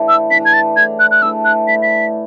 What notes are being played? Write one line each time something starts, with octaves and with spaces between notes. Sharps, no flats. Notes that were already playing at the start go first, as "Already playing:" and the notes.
Already playing: A2 E3 A3 D4
E6
E3 A3 D4 B6
G#6
A6
A2 G#6
F#6
F#6
E3 A3 D4 E6
F#6
A2 B6
B6